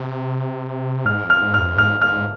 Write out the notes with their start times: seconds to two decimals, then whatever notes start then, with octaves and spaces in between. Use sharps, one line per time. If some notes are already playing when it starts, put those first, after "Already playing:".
Already playing: C3
1.05 G#2 F6
1.24 F2
1.30 F6
1.41 G#2
1.54 F6
1.59 F2
1.76 G#2 F6
2.00 G#2 F6